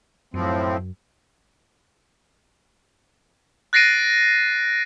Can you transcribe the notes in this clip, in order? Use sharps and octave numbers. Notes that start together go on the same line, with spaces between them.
F#2 A2 F3 C4
F#6 A6 A#6 C7 D7 D#7